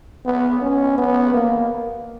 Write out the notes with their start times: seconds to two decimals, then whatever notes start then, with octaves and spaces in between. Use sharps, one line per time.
0.25 B3
0.61 C#4
0.98 B3
1.34 A#3